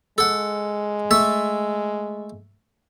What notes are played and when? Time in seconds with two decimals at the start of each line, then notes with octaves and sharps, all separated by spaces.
0.18 G#3 A4 F#5
1.11 A3 E5 A5